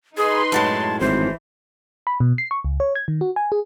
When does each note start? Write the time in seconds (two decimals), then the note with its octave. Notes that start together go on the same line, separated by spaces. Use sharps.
0.17 D#4 G#4 B4 C6
0.52 F#2 A2 G#3 A5
1.00 G#1 E3 C5
2.07 B5
2.20 B2
2.38 C7
2.51 C#6
2.65 C#2
2.80 C#5
2.95 G#6
3.08 D#3
3.21 F#4
3.36 G#5
3.52 G#4